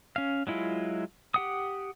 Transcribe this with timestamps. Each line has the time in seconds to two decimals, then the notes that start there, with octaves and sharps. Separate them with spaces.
0.16 C#4 F5
0.47 F#3 G#3 E4 F4
1.34 G4 F#5 D#6